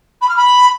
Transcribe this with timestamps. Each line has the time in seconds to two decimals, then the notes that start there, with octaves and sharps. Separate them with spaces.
0.21 B5
0.28 F6
0.36 B5